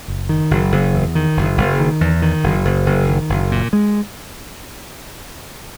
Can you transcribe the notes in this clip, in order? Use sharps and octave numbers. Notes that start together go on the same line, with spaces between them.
F#1
D#3
F#1
F#1
E2
D#3
F#1
F#1
D#3
E2
D#3
F#1
F#1
F#1
D#3
F#1
A#2
G#3